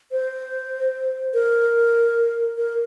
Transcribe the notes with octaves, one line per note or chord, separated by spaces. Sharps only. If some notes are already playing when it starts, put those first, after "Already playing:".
C5
A#4
A#4